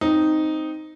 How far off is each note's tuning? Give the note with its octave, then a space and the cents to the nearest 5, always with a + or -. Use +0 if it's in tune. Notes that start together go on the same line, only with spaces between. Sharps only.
C4 +0 D#4 +0